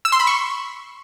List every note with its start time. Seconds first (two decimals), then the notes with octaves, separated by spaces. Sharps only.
0.05 E6
0.12 C6
0.20 B5
0.27 C#6